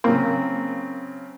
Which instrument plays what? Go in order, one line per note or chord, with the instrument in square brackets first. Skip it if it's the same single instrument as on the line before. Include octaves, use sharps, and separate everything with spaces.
[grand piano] C#3 F#3 C4 [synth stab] A#3